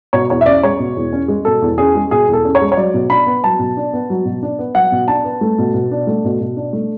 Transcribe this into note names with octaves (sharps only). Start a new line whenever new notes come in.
B2 C#5
E2 C#5
E5
C#4 D5
G#3 C#5
B2
E2
C#4
G#3
B2 A4
E2
C#4 G#4
G#3
B2 G#4
E2
A4
C#4
C#5
G#3
C#5
F#3 D5
B2
D4 B5
B3
F#3 A5
B2
D4
B3
F#3
B2
D4
B3
F#3 F#5
B2
D4 A5
B3
A3
B2
B2
D4
A3
B2
B2
D4
A3